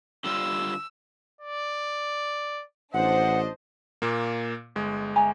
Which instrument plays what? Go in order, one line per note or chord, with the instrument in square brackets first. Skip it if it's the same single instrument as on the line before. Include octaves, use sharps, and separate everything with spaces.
[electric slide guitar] D3 G3 F4 [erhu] E6
[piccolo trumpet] D5
[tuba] A1 [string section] D4 C5 [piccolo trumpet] D#5 [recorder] F#5
[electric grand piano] A#2 A#3
G1 G#3
[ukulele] E5 G#5 A#5